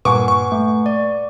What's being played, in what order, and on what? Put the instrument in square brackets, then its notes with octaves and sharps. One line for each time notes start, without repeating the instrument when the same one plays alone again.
[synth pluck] G2 A#2 D6 [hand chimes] B4 F#5 G#5 [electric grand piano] C#6
[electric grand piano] C#6
[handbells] A3
D5